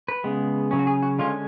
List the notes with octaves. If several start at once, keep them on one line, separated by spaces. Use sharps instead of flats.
B4
C#3 G#3 B3
C#3 F#3 C#4
F#4
G#4
F#4
D3 G#3 C#4 F4